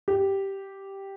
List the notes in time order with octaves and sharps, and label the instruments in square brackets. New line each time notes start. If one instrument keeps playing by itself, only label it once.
[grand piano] G4